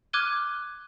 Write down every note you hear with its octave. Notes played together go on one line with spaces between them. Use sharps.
D6 F6 F#6 G#6 D#7 G7